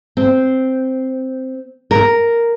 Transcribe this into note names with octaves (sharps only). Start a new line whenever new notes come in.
C4
A#4